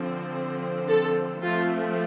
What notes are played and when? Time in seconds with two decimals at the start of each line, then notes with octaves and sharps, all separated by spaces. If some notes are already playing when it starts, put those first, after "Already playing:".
Already playing: D3 F3 C4
0.88 A4
1.43 F3 A3 C4 F4